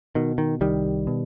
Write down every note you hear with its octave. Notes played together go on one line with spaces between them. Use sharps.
B2 D#3
D#3
C2 D#3 G3
B2